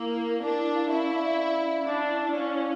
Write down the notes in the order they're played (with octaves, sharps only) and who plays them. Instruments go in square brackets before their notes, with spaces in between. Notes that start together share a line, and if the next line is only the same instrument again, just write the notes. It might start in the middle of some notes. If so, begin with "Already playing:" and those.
Already playing: [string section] A#3 [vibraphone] E4
[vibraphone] A#4
A#4
[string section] D4 [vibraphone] D5
[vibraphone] E4
F5
[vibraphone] C#4 [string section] E4
[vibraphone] D5
D5
D5
C#4
C#4
[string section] D4 [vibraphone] D5
[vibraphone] E4
D5
[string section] C#4 [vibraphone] F5
[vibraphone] E4